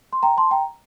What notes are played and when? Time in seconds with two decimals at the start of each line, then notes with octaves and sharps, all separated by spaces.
0.13 C6
0.23 G5 A#5
0.37 A5 C6
0.51 G5 A#5